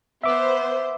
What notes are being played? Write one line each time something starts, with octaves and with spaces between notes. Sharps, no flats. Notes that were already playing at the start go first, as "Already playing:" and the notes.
B3 C5 E5 D6